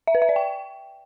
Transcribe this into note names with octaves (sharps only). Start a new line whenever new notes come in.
E5
B4
E5
D5
G5